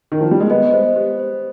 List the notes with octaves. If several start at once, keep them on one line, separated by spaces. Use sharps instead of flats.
D#3
F3
G3
G#3
B3 D#5
C5
G4
C5